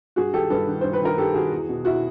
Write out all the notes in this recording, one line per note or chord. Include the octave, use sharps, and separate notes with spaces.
G2 F#4 G#4
D#3 G4 A4
G2 A4 B4
D#3
G2 C5
B4
D#3 A#4
G2 G4 A4
D#3 F#4 G#4
E2
B2
E4 F#4